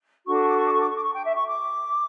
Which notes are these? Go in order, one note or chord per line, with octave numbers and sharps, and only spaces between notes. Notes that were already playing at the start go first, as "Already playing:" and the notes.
D4 F#4 A4 C#6
D6
C#6
D6
C#6
D6
C#6
D6
C#6
D6
C#6
G5
E5
C#6
D6